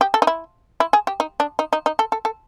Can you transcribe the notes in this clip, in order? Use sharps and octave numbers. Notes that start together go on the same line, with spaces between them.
G4
A4
D#4
E4
E4
G#4
G4
D#4
D4
D#4
D#4
D#4
A4
A4
A4